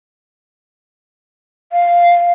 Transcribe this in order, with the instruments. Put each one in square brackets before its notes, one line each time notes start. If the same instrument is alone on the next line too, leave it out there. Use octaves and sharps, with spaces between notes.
[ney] F5